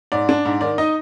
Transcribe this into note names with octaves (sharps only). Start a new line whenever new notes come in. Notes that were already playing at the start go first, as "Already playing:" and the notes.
G#2 D5
D4
G#2
D#3 D5
D#4 D#5